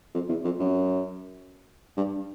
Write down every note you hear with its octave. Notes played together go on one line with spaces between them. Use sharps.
F2
E2
F2
F#2
G2